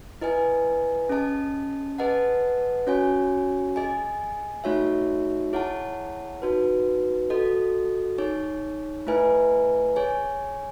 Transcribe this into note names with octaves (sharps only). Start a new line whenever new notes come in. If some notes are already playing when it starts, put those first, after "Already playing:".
E4 B4 D#5 G#5
C#4 G#4 D#5 A5
G#4 B4 D#5 F#5 A5
C#4 F#4 C#5 G#5
G#4 D#5 G#5
A3 D#4 F#4 C#5 E5
E4 G#4 C#5 F#5 A5
D#4 F#4 B4
F#4 A4 D#5
D#4 G#4 C#5
A3 E4 B4 E5 G#5
G#4 C#5 G#5